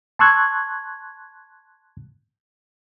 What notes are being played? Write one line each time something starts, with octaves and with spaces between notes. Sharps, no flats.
A5 C6 C#6 E6 F#6 G#6